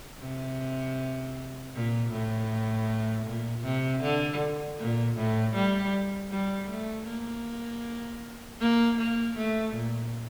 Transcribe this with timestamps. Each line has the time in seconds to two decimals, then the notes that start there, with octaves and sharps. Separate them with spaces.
0.21 C3
1.74 A#2
2.12 A2
3.26 A#2
3.64 C3
4.02 D3
4.79 A#2
5.17 A2
5.55 G3
6.31 G3
6.69 A3
7.07 A#3
8.60 A#3
8.98 A#3
9.36 A3
9.74 A#2